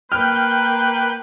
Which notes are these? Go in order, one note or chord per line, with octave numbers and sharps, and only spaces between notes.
A#3 B4 G5 F6